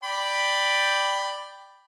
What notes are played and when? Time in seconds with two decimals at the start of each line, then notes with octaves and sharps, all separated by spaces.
0.03 D5 G5 B5